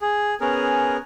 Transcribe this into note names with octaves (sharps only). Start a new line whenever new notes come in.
G#4
B3 C#4 G#4 A#4